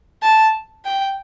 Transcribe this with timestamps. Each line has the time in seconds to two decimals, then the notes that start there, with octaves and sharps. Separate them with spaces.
0.23 A5
0.85 G5